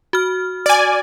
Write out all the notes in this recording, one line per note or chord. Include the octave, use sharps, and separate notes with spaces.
F#4 F6
D5 G#5